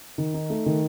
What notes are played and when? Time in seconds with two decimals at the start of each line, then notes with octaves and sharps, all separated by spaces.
0.18 D#3
0.34 D#4
0.50 A3
0.66 D#3